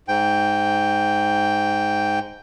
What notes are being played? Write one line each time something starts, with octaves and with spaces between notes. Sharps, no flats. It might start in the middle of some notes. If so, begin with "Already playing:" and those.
G#2 G5